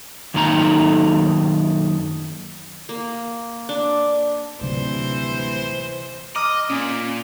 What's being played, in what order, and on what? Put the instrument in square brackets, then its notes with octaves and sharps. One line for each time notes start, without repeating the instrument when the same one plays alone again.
[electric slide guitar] F#2 D#3 A#3 D#4 A4 A#5
[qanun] A#3
D4
[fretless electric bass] D1 G2 [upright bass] C3 D#3 [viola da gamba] E3 C5
[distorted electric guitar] D#5 [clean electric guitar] A#5 [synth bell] D6 F6 D#7
[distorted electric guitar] A#2 [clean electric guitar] C#4 G#5